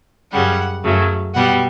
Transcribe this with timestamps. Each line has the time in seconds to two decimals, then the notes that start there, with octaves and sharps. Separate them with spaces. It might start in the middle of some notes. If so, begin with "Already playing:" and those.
0.32 F#2 C#3 G3 F#5
0.84 F#2 C#3 F#3 A3
1.34 B2 G3 F#5